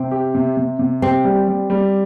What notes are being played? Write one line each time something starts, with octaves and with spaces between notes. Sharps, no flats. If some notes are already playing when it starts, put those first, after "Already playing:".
Already playing: C3 C4
G4
C3
C3
C3
C4 G4
G3
G3
G3